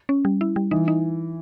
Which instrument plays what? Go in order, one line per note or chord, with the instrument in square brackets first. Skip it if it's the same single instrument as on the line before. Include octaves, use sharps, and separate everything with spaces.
[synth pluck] C#4
G3
E4
G3
[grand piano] E3 [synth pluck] D#4
[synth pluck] D#4